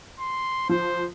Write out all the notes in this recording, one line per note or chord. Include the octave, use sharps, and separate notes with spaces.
C6
F3 C5